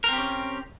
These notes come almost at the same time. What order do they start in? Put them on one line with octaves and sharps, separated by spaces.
A#4 C4 G4 C#4